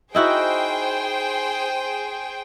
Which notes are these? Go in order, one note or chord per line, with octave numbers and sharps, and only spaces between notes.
D#4 E4 F#4 G#4 C5 G5